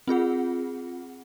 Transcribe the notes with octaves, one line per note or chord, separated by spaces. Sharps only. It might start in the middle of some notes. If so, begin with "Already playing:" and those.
C4 F4 G#4 F#5